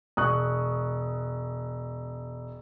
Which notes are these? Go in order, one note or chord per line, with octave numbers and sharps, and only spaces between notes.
E1 C#6 D#6 F#6